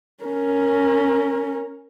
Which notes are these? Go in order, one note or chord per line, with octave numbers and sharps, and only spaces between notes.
C#4 A#4